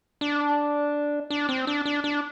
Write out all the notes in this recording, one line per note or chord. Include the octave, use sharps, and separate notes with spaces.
D4
D4
C4
D4
D4
D4